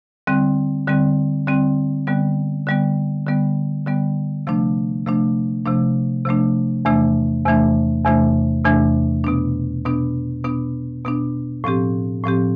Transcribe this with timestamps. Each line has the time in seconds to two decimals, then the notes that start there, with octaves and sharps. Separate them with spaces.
0.27 D3 G3 C4
0.88 D3 G3 C4
1.47 D3 G3 C4
2.07 D3 G3 B3
2.67 D3 G3 B3
3.27 D3 G3 B3
3.86 D3 G3 B3
4.47 C3 F3 A3 D4
5.06 C3 F3 A3 D4
5.65 C3 F3 A3 D4
6.25 C3 F3 A3 D4
6.85 E2 C3 E3 A3 D4
7.46 E2 C3 E3 A3 D4
8.05 E2 C3 E3 A3 D4
8.65 E2 C3 E3 A3 D4
9.24 B2 B3 D4
9.85 B2 B3 D4
10.44 B2 B3 D4
11.05 B2 B3 D4
11.64 A2 F3 C4 G4
12.24 A2 F3 C4 G4